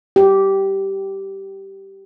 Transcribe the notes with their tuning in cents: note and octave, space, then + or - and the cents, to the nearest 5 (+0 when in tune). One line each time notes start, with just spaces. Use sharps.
G4 -10